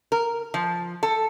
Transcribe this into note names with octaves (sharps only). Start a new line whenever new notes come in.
A#4
F3
A4